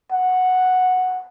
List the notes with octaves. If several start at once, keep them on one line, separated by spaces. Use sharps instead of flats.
F#5